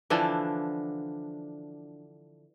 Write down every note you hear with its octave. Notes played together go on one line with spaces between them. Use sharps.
D3 E3 F3 D4